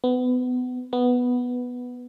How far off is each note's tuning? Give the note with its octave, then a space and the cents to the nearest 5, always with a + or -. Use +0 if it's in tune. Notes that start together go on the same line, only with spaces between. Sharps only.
B3 +25
B3 +0